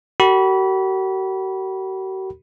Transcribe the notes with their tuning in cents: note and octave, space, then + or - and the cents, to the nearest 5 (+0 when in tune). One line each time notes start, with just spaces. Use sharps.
F#4 +45 A#4 -40 B5 -20